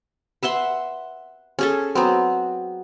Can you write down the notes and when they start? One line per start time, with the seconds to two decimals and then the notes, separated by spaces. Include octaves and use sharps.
0.43 B4 E5 F#5 C6
1.59 C#4 G#4 A4
1.95 F#3 B3 C4